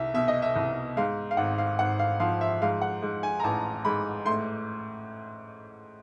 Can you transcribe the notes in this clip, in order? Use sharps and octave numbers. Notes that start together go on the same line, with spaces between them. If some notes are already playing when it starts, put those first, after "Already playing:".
Already playing: C2 E5
B2 E5
D#5
E5
C2
G#2 F5
F5
G#1 F#5
F5
G#1 F#5
F5
F3 F5
E5
G#2 F5
F#5
G#2
G#5
A#5
A1 A5
G#2 B5
A2 C6